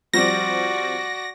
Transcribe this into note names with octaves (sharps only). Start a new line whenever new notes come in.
F3 G3 C4 F#4 D5 A#6